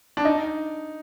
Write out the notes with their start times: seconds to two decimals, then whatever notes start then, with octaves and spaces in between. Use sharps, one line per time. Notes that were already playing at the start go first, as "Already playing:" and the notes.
0.17 D4
0.25 D#4